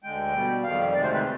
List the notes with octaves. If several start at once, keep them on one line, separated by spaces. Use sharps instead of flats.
D2 D3 G#3 G5
B2 G3
F2 D#3 G3 F5
D2 C3 D#3 G#3 D5
C5
B4